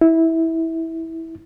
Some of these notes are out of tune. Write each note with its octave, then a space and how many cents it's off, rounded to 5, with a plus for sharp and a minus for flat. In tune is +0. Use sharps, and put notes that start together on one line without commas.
E4 -15